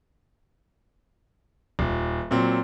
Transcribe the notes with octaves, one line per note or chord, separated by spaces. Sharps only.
D#1
A#2 F#3 C4